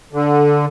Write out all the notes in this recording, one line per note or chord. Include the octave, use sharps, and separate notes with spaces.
D3